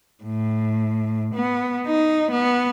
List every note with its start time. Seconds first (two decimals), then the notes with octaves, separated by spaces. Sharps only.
0.24 A2
1.34 B3
1.87 D#4
2.31 B3